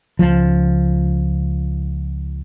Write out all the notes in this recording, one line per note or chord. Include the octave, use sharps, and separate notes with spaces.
C#2 F3